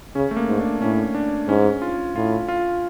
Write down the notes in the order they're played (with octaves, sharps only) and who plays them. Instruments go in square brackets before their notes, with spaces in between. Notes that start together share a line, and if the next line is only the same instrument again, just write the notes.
[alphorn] C#3 [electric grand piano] C#4
[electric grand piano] A3
A#3
[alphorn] G#2
[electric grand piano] D4
[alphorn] A2 [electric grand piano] C#4
[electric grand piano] D4
[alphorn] G#2 [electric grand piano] C#4
[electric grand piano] F4
[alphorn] A2 [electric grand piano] F4
[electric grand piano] F4